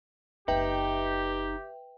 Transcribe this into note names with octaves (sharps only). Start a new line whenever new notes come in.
F#1 C4 D#4 G4 B4 E5 G5